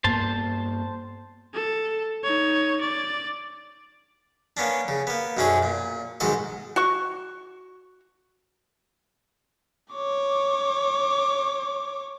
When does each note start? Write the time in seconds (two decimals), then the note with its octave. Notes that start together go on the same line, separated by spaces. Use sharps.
0.04 G2 A#3 B3 C5 A5
1.54 A4
2.23 D#4 C#5
2.81 D5
4.57 A#3 B3 C#4 D4
4.88 C#3
5.07 A#3 B3
5.37 B1 F#2 C#4 D4 F#4 G#4
5.63 A#2
6.20 B1 G#2 D#3 G#3 F#4 D#5
6.76 F#4 C#6
9.94 C#5 D6